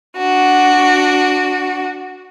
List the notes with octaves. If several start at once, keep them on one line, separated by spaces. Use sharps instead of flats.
D4 F#4